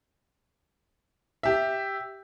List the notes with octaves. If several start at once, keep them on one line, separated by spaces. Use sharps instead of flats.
G4 E5